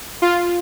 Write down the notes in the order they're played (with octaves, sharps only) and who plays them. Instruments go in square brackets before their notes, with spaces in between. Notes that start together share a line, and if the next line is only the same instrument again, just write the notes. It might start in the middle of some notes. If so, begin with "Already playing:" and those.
[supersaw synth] F4